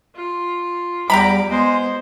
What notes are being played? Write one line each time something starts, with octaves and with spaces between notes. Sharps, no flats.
F4
E2 G3 G4 A#5 B5 D6
G#3 B3 C5